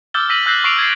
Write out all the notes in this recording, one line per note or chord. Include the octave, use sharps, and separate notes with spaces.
D6 E6 F6 G6 A6 G7
E6 A#6 B6 D#7 F#7
E6 F#6 G6 A#6 C7 F#7
C#6 D6 C7 D7 F7
G#6 A6 C7